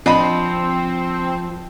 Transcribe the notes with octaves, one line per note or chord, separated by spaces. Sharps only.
F3 C4 D4 D#5 B5